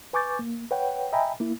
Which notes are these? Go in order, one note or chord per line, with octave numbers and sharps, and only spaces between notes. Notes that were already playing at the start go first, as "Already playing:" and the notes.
B4 G#5 C#6 D6 G6 A6
A#3
B4 C#5 F#5 G5
D#5 E5 G5 G#5 A#5 B5
A#3 E4